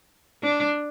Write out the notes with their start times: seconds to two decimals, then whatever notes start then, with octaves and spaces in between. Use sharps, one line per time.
0.43 D4